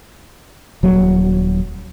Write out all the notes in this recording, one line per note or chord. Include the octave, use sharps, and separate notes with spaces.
D#1 F#3